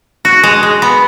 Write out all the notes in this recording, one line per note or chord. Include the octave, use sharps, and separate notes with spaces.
F#4
G#3
G#3
B3